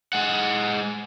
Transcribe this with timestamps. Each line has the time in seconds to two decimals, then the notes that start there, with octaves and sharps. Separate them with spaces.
0.13 G#3 F#5